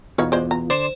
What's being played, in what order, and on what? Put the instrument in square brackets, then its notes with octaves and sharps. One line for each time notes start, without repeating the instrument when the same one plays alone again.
[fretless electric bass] E2 B2 [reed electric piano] B3 F4 [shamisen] D#4 C#5 F5
[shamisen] G#3 C5 D5
A#5
[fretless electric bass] D3 [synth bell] C5 E7 [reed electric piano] D5 C6